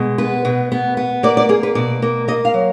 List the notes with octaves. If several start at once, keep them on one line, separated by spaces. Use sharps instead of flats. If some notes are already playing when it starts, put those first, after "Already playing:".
Already playing: B2 G#3
B3 B4
B2
B3
B3
A#3 D5
D5
A#3 G#4
B4
B2 D5
A#3
A#3 D#5
F5
F#3